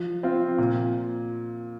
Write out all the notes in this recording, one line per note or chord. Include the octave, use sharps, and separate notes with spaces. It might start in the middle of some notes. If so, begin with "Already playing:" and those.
Already playing: F3
C4 F4
A#2